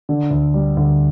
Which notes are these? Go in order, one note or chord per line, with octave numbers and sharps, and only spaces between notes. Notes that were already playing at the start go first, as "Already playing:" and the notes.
D3
D2
G3
D2